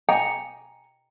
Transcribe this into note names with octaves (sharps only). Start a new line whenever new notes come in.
G5 G#5 A#5